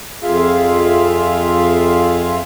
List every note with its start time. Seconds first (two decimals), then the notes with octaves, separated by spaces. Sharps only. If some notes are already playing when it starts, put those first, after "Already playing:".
0.23 F2 F4 G#4 E5 F5